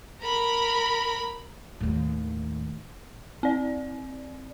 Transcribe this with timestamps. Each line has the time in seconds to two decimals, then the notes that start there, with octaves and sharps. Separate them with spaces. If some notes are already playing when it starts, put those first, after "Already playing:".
0.22 A#4 B5
1.80 D#2 A2
3.43 C4 D5